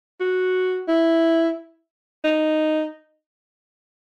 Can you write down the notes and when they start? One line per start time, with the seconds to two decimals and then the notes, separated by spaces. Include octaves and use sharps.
0.21 F#4
0.88 E4
2.24 D#4